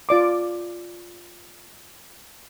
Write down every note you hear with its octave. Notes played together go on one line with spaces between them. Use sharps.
F4 D5 D6